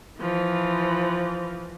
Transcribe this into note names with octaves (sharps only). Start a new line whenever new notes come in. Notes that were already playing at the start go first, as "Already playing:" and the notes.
E3 F3